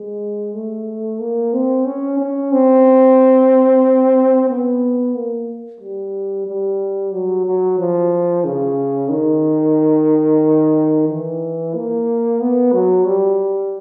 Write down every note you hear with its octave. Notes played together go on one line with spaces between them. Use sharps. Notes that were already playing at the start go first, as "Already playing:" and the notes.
Already playing: G#3
A3
A#3
C4
C#4
C#4
C4
B3
A#3
G3
G3
F#3
F#3
F3
C#3
D#3
E3
A#3
B3
F#3
G3